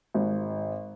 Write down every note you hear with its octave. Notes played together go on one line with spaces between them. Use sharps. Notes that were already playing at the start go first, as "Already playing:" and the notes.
G#1